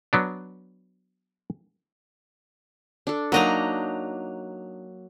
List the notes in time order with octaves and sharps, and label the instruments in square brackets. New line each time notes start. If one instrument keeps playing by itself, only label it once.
[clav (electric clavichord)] F#3 B3 D4
[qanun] D4 A4
[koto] F#3 D#5 A#5 [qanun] A#3 D4 D#4